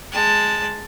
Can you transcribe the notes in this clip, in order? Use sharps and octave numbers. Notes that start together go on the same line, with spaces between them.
G#3 A5